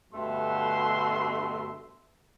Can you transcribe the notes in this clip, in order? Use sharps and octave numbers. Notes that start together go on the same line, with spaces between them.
G2 B2 D3 A3 E5 C6